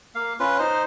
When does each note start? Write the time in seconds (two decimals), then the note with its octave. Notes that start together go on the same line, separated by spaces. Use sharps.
0.15 A#3 F5
0.40 C#4 F4 B4
0.59 D#4 C5